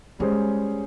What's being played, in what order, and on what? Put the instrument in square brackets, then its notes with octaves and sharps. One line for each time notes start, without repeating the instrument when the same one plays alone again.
[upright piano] G3 C#4 G#4 C5 [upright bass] G#3